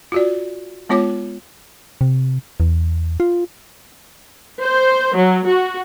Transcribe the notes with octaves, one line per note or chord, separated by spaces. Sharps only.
F4 F#4 D5
G#3 B3 F4 C#5 D6
C3
E2
F4
C5
F#3
F#4